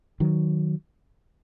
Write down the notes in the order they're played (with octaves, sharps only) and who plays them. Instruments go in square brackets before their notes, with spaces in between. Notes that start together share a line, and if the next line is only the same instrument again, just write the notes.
[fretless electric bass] D#3 F#3